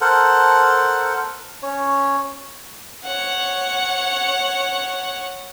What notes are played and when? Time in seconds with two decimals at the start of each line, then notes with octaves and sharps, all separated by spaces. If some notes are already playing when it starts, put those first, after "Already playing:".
0.01 A4 A#4 C5 F#5
1.63 C#4 C#5
3.04 C#5 F#5